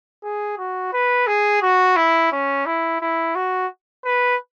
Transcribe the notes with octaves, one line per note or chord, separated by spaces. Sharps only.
G#4
F#4
B4
G#4
F#4
E4
C#4
E4
E4
F#4
B4